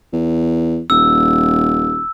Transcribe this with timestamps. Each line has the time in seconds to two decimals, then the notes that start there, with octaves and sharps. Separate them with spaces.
0.13 E2
0.90 D#1 E6